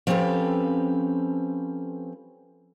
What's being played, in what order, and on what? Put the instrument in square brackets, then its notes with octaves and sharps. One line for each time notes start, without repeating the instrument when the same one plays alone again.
[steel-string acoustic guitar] F3 C4 C#4 G4 A4 B4